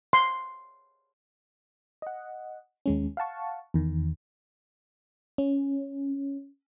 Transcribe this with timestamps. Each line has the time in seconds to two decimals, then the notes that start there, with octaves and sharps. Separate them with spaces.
0.13 C6
2.02 D#5 F#5
2.86 D#2 G#3 C#4
3.17 F5 F#5 A5 C#6
3.74 E2 D#3
5.38 C#4